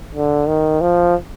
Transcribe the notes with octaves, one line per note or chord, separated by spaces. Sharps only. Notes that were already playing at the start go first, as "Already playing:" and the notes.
D3
D#3
F3